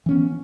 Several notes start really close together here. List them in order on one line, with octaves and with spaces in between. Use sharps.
E3 C#4 B3